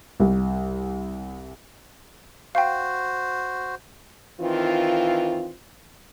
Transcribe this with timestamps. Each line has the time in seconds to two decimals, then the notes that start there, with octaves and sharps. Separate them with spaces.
0.20 C2
2.55 F#4 C5 F5 G5
4.40 D#3 E3 C4 F4